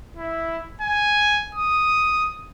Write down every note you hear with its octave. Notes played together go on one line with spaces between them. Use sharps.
E4
G#5
D#6